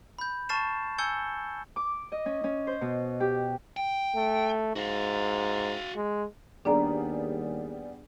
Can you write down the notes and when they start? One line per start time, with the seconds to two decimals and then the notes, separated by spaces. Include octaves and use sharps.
0.19 B5 G6
0.49 A5 C#6 F6 A6 C7 E7
0.98 G#5 E6 G6 G#6 C#7 G7
1.76 D6
2.12 D#5
2.26 C#4
2.44 C#4
2.67 C5
2.81 B2
3.20 G4
3.77 G5
4.16 A3
4.76 G#2 F#4 F5
5.96 G#3
6.65 D#2 G3 B3 D4 G#4 D5 A#5